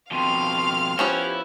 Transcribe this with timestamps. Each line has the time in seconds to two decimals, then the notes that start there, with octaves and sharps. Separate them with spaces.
0.11 F2 B2 F5 G5 C6 F6
0.99 F3 B3 C#4 E4 G4 C#5